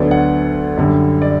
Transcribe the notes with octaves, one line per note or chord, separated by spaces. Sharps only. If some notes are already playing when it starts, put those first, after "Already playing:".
Already playing: D2 D3 F#3 B3 D5
F#5
F#2 D3 G3
D5